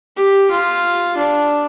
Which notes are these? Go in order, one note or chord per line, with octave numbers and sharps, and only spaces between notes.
G4
F4
D4